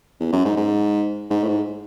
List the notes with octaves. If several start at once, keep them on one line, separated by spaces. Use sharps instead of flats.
E2
F#2
G#2
G#2
G#2
A2
G#2